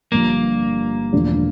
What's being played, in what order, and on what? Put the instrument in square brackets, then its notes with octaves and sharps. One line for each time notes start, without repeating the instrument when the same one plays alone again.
[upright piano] G1 G2 F3 [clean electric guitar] A#3
[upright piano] E1 E2 D3 F3 A3